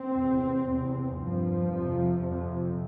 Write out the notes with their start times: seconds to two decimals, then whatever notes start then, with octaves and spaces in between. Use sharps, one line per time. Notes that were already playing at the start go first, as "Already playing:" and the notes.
Already playing: C4
0.13 E2 C3
0.64 E2 C3
1.17 G2 F3
1.69 F2 C3
2.20 F2 C3